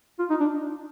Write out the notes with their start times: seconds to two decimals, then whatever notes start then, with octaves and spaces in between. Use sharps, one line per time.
0.19 F4
0.30 D#4
0.40 D4